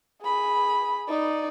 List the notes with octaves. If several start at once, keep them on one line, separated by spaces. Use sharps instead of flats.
G#4 B5
D#4 D5